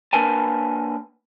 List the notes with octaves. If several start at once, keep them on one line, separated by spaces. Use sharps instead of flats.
A#3 D4 A#4 B4 G#5 A5